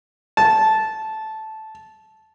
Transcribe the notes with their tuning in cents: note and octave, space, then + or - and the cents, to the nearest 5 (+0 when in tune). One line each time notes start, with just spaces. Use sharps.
A5 -10